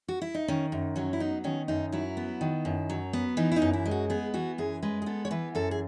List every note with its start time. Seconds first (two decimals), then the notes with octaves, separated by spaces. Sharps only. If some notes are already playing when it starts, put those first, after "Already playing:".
0.08 F#4
0.22 E4
0.35 D#4
0.48 D#3 C#4
0.72 F#2
0.96 F#3 C#4
1.13 E4
1.20 B3 D#4
1.44 D#3 C#4
1.68 F#2 D#4
1.92 F#3 E4
2.17 B3
2.41 D#3
2.65 F#2
2.90 F#3
3.13 B3
3.37 E3 D#4
3.52 E4
3.56 D#4
3.62 F#2
3.73 E4
3.85 G#3
3.91 F#4
4.10 B3 G#4
4.34 E3 F#4
4.58 F#2 G#4
4.83 G#3 B4
5.02 G#4
5.06 B3 A4
5.25 C#5
5.31 E3 B4
5.55 F#2 A4
5.71 G#4